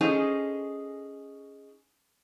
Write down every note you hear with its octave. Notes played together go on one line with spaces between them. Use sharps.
C#4 D#4 G#4 A4 C5